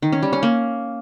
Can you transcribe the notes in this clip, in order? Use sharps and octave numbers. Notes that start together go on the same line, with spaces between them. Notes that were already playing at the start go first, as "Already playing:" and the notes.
D#3
C#4
G3
C#4
A#3